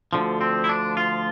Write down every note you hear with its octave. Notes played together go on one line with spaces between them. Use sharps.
D2 D3 F3
C4
E4
D4
F4